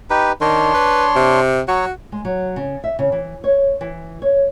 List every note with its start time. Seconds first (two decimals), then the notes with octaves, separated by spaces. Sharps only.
0.10 D#4 G4 B4
0.41 D#3 D4 C#5 C6
0.74 B4
1.16 C3
1.68 F#3 F#4 C#5
2.12 G#3
2.25 F#3
2.56 C#3
2.84 E5
2.99 C#3
3.12 E3
3.44 C#5
3.81 E3
4.22 C#5